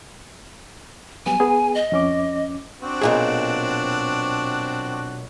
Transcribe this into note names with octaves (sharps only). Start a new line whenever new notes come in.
F#3 G3 B3 G#5
B3 G#4
D#5
F2 C#4 D6
C4 D4 F#4
B1 A#2 G#4